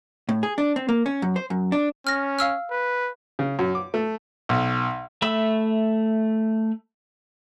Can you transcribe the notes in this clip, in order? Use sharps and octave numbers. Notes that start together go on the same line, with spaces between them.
A2
G#4
D4
C4
A#3
C#4
F#2
C5
F#2
D4
C#4 F6 A#6
F5 E6 F6
B4
C#3
F#2
D6
A3
B1
A3 E5 B5 E6